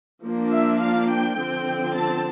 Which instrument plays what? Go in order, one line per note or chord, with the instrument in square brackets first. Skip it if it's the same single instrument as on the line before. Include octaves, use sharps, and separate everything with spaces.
[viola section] F3 A#3 D4
E5
F5
G5
D3 F3 C4
A5